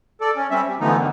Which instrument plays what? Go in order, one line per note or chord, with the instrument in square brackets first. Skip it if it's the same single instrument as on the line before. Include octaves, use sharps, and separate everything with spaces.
[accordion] A4 D5
C#4
G3 C4 C#4 E5
G3
D3 E3 F3 A3 B3 D#4
F#2 D3 D#3